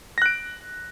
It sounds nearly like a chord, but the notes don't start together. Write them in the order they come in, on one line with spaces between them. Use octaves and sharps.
A#6 F#6 D7